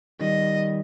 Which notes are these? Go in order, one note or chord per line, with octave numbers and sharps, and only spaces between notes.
D#3 G3 D#5